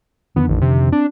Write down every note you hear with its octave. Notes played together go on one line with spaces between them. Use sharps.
F2 D3 D#3 B3
A1
C3
C4 D4